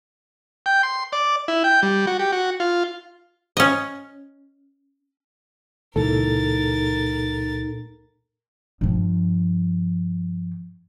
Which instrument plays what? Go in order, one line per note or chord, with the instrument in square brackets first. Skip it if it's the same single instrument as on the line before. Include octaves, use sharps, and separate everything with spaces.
[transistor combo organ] G5
C6
D5
E4
G5
G3
F#4
G4
F#4
F4
[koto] C#4 D#5
[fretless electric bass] C#2 E3 [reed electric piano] A#2 A4 [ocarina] D#4 [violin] A#4 A6
[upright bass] G2 F3